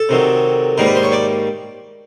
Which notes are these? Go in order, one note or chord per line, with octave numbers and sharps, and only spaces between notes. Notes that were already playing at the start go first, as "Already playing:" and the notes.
Already playing: A4
C3 D#3 F#3
G#2 D#3 G3 A#3 A#4
B4
C5
C#5
D5